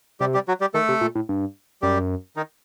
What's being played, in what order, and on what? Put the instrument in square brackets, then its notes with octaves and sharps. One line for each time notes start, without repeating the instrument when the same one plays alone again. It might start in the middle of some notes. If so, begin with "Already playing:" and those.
[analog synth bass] C3 [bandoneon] G3 G4
[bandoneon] G3 G4
F#3 F#4
G3 G4
[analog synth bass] D#3 [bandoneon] A3 A4
[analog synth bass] C3
A#2
A2
G2
[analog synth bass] F#2 [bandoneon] G3 G4
[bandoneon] D#3 D#4